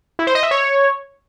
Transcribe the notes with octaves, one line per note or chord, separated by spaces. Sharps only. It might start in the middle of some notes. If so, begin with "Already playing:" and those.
E4
C5
D#5
E5
C#5